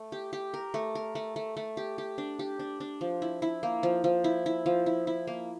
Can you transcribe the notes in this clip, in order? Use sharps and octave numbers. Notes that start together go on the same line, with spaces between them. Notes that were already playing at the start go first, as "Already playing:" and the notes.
Already playing: A3
G4
G4
A#4
A3
A#4
A3
A3
A3
G4
G4
D4
G4
D4
D4
F3
E4
E4
A#3
F3
F3
E4
E4
F3
E4
E4
A#3